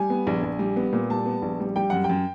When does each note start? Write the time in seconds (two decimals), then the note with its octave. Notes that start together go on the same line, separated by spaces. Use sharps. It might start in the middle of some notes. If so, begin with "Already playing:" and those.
Already playing: G3 G#5
0.10 B3
0.27 A#1
0.43 A#1
0.59 G3
0.76 B3
0.93 A#2
1.10 G3 A5
1.26 B3
1.42 A#1
1.60 G3
1.76 G3 G5
1.90 F#2 F#5
2.04 G5
2.09 F#2